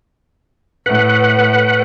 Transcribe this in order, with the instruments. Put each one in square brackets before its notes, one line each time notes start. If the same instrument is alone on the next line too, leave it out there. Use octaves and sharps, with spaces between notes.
[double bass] A2 A3 [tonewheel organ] B4 F#5